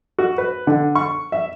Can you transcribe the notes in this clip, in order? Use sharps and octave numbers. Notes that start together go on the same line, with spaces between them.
F#4
B4
D3
C#6
E5